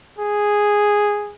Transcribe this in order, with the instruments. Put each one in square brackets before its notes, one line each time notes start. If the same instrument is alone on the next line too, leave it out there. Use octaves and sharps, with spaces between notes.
[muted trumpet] G#4